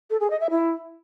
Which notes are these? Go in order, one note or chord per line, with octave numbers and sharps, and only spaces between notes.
A4
G#4
D#5
E5
E4